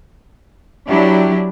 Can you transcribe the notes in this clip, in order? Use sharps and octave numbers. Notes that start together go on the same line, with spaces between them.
F#3 D4 E4 G4